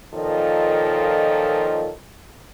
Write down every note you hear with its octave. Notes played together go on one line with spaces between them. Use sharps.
A#2 D#3 F3 A4 C#5 D#5